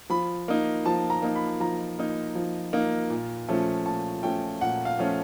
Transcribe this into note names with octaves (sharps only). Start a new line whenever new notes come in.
F3 B5
A#3 D#4
F3 A5
A#5
A#3 D#4
B5
F3 A#5
A#3 D#4
F3
A#3 D#4
A#2
F3 A3 C#4
A#2 A5
F3 A3 C#4 G5
A#2 F#5
F5
F3 A3 C#4